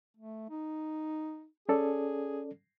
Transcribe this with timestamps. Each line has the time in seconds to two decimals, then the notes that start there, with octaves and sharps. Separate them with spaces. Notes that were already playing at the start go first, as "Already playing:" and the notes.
0.17 A3
0.50 D#4
1.69 C#4 G#4 A4 D5